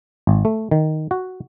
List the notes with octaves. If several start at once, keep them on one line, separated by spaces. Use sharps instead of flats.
G#1
A3
D#3
F#4